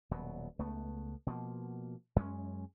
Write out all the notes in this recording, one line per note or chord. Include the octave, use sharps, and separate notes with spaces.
D#1 B2 F#3
C#2 A3 B3
B2 F3 A#3
F#2 G#3 B3 C#4